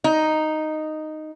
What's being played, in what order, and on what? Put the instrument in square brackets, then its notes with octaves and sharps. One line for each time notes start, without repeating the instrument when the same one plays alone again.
[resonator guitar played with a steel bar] D#4